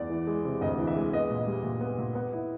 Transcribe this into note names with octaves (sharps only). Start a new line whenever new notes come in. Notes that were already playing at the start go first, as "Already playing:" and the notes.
Already playing: E2 D5
E3
G#3
C3
D2 D#5
E3
E5
G#3
B3 D#5
A#2
G3
A#2
B3
A#2
B3
E4